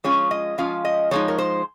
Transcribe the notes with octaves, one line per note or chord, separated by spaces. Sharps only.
F3 G#3 C#4 F4 C#5
D#5
F3 G#3 C#4 F4 F5
D#5
F3 G#3 D#4 C#5
A#4
C5